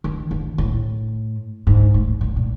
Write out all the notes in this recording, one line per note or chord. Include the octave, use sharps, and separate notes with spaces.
D#3
D#3
A2
G#2
A2
A#2
A#2